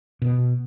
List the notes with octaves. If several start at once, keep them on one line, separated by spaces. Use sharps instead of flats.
B2